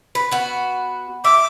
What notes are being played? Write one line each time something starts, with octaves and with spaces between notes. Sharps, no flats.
B4
B3 F#4
E5 D6